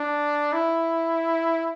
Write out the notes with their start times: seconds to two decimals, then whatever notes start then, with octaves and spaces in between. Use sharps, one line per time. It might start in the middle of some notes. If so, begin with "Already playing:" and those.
Already playing: D4
0.53 E4